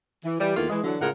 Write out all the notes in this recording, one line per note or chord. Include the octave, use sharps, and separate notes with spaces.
E3
E3 G3
E2 D#3 A3 A#3 F4
E3 G#3
D3 E3 F#3
A2 C#3 G#3 F4 A#4 F#5